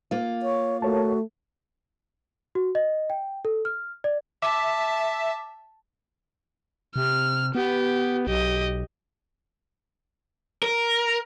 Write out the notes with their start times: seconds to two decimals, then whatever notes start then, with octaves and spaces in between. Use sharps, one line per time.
0.11 A#3 F4
0.42 C#5
0.82 A3 F#4 A#4 C#5 A5
2.55 F#4
2.75 D#5
3.10 G5
3.45 A4
3.65 F6
4.04 D5
4.42 E5 A5 D6
6.96 C3 F6
7.55 B3 G4
8.27 B1 G4 D#5
10.63 A#4